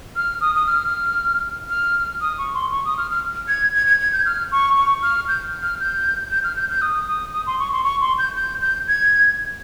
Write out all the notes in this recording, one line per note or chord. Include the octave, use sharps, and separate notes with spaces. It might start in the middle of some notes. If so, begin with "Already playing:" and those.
F6
D#6
D#6
F6
F6
D#6
C#6
C6
C#6
D#6
F6
F6
G#6
G#6
G#6
G#6
G6
F6
C#6
C#6
F6
G6
F6
G6
G6
F6
G6
G6
D#6
D#6
D#6
C6
C#6
C6
C#6
C6
G6
G6
G6
G#6